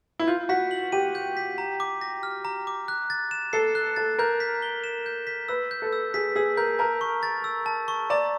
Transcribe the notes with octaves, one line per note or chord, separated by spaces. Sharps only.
E4
F4 G6
F#4 B6
F#7
G4 D#7
G6
B6
A#5
D6
A#6
F6
A#5
D6
F#6
A6
E7
A4 C7
F#6
A4 A6
A#4 G6
B6
G7
E7
G6
B6
B4 E6
G6
A4
E6
G#4 B6
G#4 E6
A#4 G6
A#4 A5
C#6
A6
E6
A5
C#6
D5 A#5